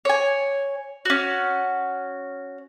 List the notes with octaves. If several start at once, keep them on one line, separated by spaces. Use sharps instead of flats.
C#5 G#5
C#4 F#4